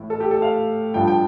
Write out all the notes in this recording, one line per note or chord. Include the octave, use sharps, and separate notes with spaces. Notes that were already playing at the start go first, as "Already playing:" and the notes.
Already playing: A2 E3
A4
G4
A4
F5
G2 F3 G5
G5